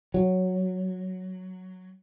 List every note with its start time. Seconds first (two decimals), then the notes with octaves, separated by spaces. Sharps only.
0.14 F#3